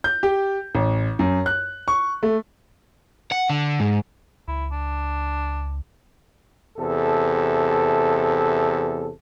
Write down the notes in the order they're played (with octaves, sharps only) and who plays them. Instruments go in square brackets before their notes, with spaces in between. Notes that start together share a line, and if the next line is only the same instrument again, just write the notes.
[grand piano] G6
G4
A1
F#2
F#6
C#6
A3
[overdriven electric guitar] F#5
D3
G#2
[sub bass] C#2 [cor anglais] E4
[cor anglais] D4
[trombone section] E2 C3 A4